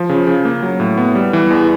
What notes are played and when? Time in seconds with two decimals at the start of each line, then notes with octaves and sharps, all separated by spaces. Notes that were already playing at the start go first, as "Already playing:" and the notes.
Already playing: F3
0.09 C#3
0.27 C#3
0.45 A#3
0.63 F#3
0.80 A2
0.97 B3
1.15 G3
1.33 E3
1.50 E2